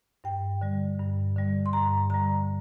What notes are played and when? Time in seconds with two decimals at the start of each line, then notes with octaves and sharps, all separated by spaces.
0.24 G2 G5
0.61 D3 G3
0.99 G2
1.36 D3 G3
1.66 C6
1.73 G2 A#5
2.10 D3 G3 A#5